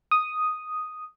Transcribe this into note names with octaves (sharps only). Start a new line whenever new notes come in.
D#6